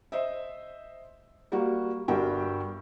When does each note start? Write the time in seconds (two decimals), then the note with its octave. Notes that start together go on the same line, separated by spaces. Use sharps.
0.12 C5 D#5 E5
1.52 G3 A#3 F#4
2.08 G1 G2 F#4 G4 A#4 G5